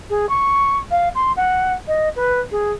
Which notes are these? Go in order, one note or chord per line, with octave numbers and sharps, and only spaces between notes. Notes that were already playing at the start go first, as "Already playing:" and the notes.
G#4
C#6
F5
C6
F#5
D#5
B4
G#4